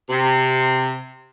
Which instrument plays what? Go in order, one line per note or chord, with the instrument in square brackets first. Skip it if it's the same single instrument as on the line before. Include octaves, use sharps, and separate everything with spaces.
[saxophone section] C3